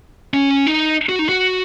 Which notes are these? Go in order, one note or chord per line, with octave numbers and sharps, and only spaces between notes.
C#4
D#4
F#4
D#4
F#4